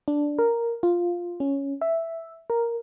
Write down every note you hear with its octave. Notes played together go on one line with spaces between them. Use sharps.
D4
A#4
F4
C#4
E5
A#4